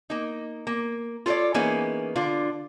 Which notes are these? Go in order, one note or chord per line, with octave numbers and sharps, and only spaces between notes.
A#3 D#4
A#3
F4 A4 B4 C#5 D5
E3 A#3 B3 C#4 D#4 G#4
D3 D4 F4